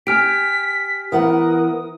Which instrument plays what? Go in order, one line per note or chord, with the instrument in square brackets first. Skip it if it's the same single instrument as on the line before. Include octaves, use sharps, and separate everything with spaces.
[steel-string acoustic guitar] G4 [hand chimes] G#5 F6 D7 [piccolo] B6
[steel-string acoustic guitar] E3 B3 F#5 [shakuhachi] A#4 [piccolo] D#6